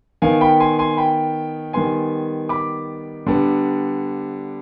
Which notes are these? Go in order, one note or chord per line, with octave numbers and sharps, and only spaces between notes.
D#3 B3 F5 G#5
G5 B5
G#5 C6
G#5 C6
G5 B5
D#3 G3 B3 G#5 C6
B5 D6
D3 G3 B3